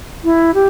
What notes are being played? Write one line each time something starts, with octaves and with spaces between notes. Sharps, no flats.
E4
G4